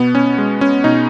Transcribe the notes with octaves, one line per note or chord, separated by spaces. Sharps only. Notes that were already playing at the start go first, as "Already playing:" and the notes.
Already playing: B2 B3
C#4
G#3
C#4
B2 D#4